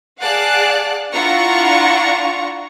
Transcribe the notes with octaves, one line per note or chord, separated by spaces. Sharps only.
G#4 D5 F5 F#5 A5 F#6
D4 E4 F4 F#5 A#5 C#6